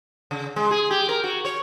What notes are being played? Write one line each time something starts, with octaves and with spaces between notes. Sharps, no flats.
C#3
G#3
G#4
G4
A#4
F#4
C#5